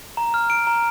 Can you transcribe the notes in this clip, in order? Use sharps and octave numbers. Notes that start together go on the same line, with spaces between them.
A#5
F6
D7
A#5